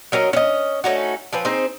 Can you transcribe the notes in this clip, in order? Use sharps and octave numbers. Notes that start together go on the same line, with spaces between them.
F#3 C#4 A#4 D#5
C#4 D#5
A3 C#4 D#4 F#4
F3 C4 C#4 B4
C4 D#4 G#4 C5